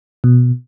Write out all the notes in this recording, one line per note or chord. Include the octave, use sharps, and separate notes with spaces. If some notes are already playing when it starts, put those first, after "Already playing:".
B2